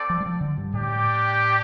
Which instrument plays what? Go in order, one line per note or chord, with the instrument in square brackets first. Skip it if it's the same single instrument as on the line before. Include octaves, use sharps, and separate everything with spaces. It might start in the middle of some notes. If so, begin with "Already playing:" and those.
Already playing: [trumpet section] C4 A4 D5
[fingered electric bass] F3
G3
F3
D3
G2
[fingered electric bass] A2 [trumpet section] D4 G4 D5 G5